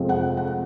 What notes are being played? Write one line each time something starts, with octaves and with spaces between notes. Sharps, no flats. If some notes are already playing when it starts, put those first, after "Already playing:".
Already playing: F2 C3 F3 G#3 C4
F#5
F#5